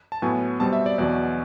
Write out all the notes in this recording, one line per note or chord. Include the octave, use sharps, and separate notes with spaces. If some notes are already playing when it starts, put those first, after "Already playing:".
A5
A2 F#3 B3 G#5
B2 G3 C4 A5
E5
D5
E2 B2 F#3 D5